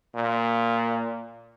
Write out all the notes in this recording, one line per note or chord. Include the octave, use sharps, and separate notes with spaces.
A#2